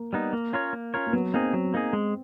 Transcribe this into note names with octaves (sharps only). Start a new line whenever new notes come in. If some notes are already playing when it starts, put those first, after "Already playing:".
Already playing: A#3
G3 B3 D#4
A#3
C#4 F4 A#4 C#5
A#3
C#4 F4 A#4 C#5
A#3
F#3 B3
A#3 C4 D#4 G#4
F#3
A#3 D#4 G#4
G#3